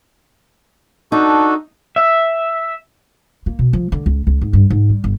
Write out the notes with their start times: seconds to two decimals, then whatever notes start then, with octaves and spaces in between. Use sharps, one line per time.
1.12 D4 D#4 F#4 A4
1.96 E5
3.46 A#3
3.59 B2
3.73 F3
3.92 D3
4.06 C#2
4.27 C#2
4.41 G#2
4.53 G2
4.70 G#2
4.89 G3
5.04 G1